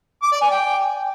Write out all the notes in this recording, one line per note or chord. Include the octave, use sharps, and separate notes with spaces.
D6
D5
G#5
G5